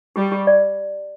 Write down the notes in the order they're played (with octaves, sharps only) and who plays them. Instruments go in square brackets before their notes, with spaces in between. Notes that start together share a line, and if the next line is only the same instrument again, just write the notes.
[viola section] G3 [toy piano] G4
[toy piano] G4
D5